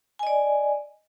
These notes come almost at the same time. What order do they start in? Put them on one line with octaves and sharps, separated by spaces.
G#5 D#5 D5